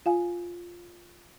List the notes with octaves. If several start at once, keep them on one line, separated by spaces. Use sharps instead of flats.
F4 F5 G#5